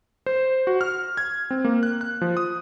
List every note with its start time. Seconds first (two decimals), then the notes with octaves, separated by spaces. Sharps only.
0.26 C5
0.67 F#4
0.81 F6
1.17 G#6
1.51 C4
1.65 A#3
1.83 F#6
2.01 F#6
2.22 F3
2.37 D#6